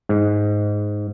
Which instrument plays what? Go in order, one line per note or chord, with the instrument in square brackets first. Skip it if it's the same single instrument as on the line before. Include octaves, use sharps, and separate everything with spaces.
[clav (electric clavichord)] G#2